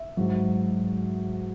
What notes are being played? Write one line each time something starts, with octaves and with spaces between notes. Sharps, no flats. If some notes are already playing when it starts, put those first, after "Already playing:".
Already playing: E5
G#2 F#3